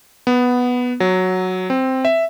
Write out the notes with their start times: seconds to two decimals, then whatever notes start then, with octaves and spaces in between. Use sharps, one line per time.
0.27 B3
1.00 F#3
1.70 C4
2.05 E5